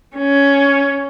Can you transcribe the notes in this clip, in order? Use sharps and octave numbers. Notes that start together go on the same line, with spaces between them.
C#4